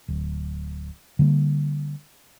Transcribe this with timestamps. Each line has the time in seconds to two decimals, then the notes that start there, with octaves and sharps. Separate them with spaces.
0.08 D1
1.19 D3 G3 A3 A#3